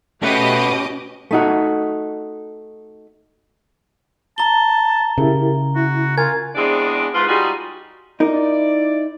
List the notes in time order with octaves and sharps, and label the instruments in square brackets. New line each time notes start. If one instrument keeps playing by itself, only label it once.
[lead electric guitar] A3 [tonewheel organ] C#4 [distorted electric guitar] F#4 B4 [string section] G4 D#5 D6
[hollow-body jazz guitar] A3 D#4 F#4
[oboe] A5 [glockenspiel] A#5 G7
[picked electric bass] C#3 [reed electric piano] E4 G4 A#4
[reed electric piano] E4 [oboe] F#4
[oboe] F4 [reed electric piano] A#4 G#5 [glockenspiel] G#6
[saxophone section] E2 G#3 C4 D4 G#4 D5
G#2 F4 B4
G3 D#4 F4 F#4 G#4
[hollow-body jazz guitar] D#4 A#4 [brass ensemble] E4 D5